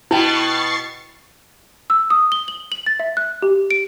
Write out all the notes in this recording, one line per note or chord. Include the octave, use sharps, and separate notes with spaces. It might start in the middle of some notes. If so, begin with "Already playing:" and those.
B2 B3 E4 G5 A5 C#6 A6 C7
E6
D#6
G7
F#7
F#7
A6
E5
F#6
G4
D7